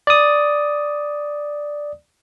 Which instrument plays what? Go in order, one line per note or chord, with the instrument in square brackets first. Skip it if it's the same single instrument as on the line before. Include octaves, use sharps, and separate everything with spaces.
[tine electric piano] D5 D#6